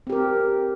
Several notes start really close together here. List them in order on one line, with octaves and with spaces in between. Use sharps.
C4 G4 A#4